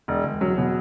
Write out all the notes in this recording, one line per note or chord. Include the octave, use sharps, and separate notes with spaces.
E1
E1
F#3
B2